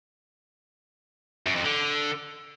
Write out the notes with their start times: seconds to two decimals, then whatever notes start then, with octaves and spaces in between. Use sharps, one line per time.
1.46 F#2
1.56 F2
1.65 D3